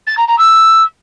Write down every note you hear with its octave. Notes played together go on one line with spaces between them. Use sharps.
A6
A#5
A#5
E6